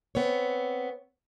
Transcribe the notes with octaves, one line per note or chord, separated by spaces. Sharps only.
B3 C4 C#5